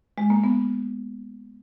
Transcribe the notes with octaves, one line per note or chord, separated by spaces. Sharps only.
G#3
A#3
B3